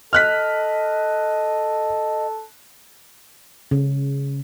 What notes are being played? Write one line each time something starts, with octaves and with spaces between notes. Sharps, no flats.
A4 D#5 F6 F#6 B6
C#3